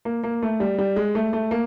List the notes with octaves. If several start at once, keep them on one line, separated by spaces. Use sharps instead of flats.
A#3
A#3
A3
G3
G3
G#3
A3
A3
A#3